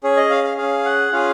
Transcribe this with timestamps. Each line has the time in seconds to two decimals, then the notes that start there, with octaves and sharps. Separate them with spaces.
0.03 C#4 G#4 C#5
0.17 D#5
0.30 F5
0.44 F5
0.57 C#4 G#4 F5
0.85 F#5
1.12 C#4 F4 G#4 F5